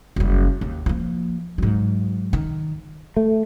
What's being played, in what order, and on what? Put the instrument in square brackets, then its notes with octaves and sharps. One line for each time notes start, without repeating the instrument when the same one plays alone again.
[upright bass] F#1 G3
D#2
F3 A#3
G#2 F#3
D#3
[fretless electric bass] A3